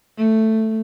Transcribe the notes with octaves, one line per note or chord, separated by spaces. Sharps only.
A3